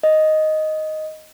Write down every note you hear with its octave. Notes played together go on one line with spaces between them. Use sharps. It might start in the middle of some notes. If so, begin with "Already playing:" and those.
D#5